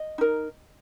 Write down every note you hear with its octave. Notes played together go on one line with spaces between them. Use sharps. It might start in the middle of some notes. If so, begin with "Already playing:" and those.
Already playing: D#5
D#4 A#4